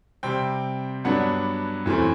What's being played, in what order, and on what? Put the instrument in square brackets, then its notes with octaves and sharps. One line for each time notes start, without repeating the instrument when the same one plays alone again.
[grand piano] C3 G3 C4 G5
G2 F#3 B3 D4 F#5
F#2 E3 A3 C4